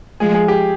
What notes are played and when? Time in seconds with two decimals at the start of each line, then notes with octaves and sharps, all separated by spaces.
0.20 F3 G#3 G#4
0.34 G#4
0.48 G4